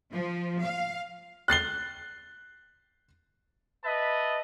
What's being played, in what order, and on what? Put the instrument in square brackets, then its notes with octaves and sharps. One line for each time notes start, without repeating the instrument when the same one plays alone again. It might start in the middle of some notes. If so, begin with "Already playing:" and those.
[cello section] F3
F5
[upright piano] F#6 A6 C7 G7
[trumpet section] B4 D#5 E5 A5 B5